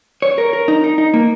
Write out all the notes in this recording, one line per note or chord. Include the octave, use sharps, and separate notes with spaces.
C#5
A#4
A#4
D#4
D#4
D#4
A#3